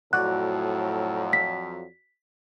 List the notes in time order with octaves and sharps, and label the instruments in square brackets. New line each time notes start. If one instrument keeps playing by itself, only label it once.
[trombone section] F2 F#3 [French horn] A2 [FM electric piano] F#4 D5 [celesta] F#6
[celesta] B6